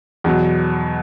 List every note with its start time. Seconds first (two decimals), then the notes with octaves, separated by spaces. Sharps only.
0.24 E2 B2 F#3